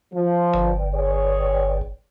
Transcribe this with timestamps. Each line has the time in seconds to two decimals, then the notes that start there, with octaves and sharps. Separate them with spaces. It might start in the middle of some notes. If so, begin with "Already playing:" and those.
0.14 F3
0.54 G1
0.95 G#4 C#5